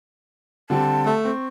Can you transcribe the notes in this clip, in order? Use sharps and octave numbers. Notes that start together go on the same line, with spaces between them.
D3 G3 C4 A5
A3
C4 C#6